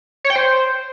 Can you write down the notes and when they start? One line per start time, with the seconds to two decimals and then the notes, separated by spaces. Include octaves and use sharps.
0.24 C#5
0.30 G5
0.36 C5